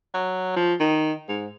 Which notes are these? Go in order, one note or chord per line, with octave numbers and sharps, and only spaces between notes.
F#3
F3
D#3
G#2